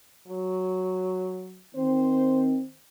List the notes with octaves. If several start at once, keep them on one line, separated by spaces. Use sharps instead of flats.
F#3
D#3 C4 C5